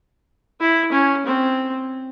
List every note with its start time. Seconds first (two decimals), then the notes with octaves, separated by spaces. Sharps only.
0.61 E4
0.92 C#4
1.26 C4